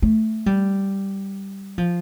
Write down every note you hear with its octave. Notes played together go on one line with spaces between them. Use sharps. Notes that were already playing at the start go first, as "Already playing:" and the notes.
A3
G3
F3